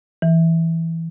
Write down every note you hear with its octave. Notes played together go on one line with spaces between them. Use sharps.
E3